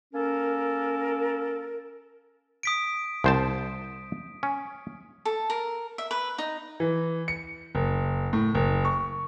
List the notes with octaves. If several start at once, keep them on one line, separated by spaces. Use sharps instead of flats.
A#3 C#4 A4 A#4
D#6 B6 D7
C2 C5 A5
C#4
A4
A#4
E5
B4
D#4
E3
C#7
F#1
A2
F#1
C#6